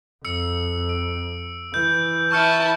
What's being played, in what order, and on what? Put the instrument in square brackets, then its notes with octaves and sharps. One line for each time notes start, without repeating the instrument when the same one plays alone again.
[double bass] F2 [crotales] E6 C#7
[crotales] D7
[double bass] E3 [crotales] G6
[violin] E4 A5 [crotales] C#6 F6 C#7